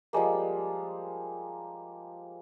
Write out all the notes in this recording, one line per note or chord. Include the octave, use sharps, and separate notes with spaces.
F3 G3 G#3 A#3